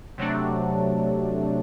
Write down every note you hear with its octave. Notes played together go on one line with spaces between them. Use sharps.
C3 F#3 A3 D4